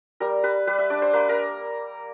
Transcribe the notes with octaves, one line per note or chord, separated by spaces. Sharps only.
G3 A#4
G3 B4
G3 B4
E5
D4 D5
C5
A#3 B4
A#4